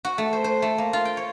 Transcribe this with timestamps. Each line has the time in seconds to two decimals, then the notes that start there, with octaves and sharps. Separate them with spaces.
0.05 F#4
0.18 A3
0.33 C5
0.44 C5
0.62 A3
0.78 A#3
0.93 F4
1.05 G5
1.17 C#5